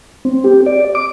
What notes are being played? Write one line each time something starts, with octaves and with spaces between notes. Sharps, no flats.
C4
G4
D5
D6